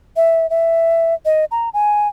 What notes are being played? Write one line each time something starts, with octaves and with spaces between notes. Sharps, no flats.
E5
E5
D#5
A#5
G#5